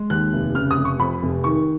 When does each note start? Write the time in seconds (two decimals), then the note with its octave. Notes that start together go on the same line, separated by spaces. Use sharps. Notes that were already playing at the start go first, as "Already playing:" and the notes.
Already playing: G#3
0.10 D#2 F#6
0.33 F1
0.55 C#3 F6
0.71 D#6
0.77 F1
0.85 C#6
0.99 F2 B5
1.23 F1
1.44 D#3 C#6